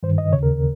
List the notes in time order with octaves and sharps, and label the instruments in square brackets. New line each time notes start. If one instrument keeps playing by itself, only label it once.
[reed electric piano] G2 D#3 C5
D#5
D#2 C#3 C#5
A#4